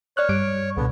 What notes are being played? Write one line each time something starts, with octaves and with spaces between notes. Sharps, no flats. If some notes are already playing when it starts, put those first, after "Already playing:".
C#5 D5 F6 F#6
G2 G3 D7
C#2 B2 D3 B3